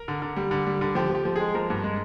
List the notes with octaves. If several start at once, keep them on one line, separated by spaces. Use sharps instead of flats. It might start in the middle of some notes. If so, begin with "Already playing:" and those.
Already playing: A#4
D3
D3
G3
D3
G3
D3
F3 G4
F3 G4
F3
G#3 G#4
F3 A#4
G2
G#3